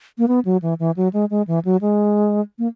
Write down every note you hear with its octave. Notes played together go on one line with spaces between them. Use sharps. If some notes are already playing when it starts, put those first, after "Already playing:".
A#3
B3
F#3
E3
E3
F#3
G#3
G#3
E3
F#3
G#3
A#3